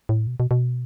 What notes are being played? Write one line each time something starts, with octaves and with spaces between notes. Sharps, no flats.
A2
B2
B2
B2